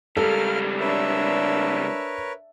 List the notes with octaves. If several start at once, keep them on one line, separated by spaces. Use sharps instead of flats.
C#2 G3 A4 A#4 F5 F6
D4 A#4 B4 C#5 E5